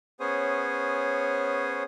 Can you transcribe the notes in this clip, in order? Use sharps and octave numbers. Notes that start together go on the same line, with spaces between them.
B3 C#4 G#4 C5 C#5 D#6